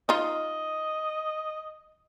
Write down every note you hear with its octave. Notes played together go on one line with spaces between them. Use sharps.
D#4 F4 D#5